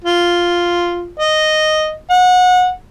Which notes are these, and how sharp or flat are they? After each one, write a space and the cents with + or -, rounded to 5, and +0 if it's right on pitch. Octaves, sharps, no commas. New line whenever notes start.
F4 +0
D#5 -5
F#5 -25